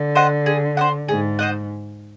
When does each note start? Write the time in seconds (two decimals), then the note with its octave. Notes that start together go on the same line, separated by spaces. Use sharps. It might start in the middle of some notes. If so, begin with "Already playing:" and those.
Already playing: D3
0.15 C5 D#5 F#5
0.46 G#4
0.77 C5 D#5 F#5
1.08 G#2 G#4
1.39 C5 D#5 F#5